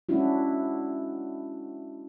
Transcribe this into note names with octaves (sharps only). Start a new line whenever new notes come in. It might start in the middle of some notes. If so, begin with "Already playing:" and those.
G#3 C#4 D4 E4 F#4